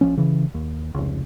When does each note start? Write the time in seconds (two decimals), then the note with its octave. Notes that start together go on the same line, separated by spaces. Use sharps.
0.01 A#1 F3 C#4
0.17 C#3 E3
0.54 D#2
0.94 F1 C#2